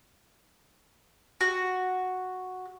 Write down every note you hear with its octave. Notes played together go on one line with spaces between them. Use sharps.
F#4